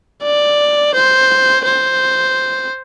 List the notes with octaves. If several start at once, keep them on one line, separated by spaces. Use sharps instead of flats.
D5
C5
C5